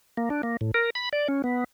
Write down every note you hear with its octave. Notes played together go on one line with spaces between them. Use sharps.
A#3
D4
A#3
A2
A#4
B5
D5
C#4
B3